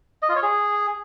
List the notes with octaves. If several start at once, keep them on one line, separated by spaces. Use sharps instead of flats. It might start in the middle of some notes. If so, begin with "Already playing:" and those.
D#5
F4
C#5
G#4